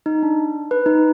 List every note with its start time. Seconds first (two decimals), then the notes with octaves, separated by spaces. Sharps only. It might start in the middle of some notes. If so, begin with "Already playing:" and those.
0.06 D#4
0.23 D4
0.71 B4
0.86 D#4